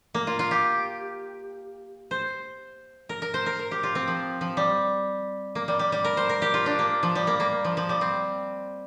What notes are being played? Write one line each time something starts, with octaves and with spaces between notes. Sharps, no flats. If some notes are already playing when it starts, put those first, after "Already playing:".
A#3
F4
F4
G4
C5
A#4
A#4
C5
A#4
A#4
G4
F4
C4
F3
F3
G3
A#3
G3
G3
G3
A#4
C5
A#4
G4
F4
D4
A#3
F3
G3
A#3
A#3
F3
F3
G3
C4